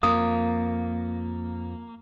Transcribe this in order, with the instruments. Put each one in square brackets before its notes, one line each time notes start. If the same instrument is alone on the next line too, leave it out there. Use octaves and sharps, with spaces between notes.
[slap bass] F2 [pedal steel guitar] A#3 [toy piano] D#6